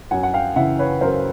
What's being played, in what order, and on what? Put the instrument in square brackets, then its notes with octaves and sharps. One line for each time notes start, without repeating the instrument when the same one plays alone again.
[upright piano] F#2 F#5 G#5
F#5
F5 G5
C#3 E3 E5 F#5
B4 C#5
F#2 A#4 C5